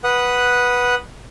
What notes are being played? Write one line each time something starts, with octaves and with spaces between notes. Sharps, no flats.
B4 F#5 D#6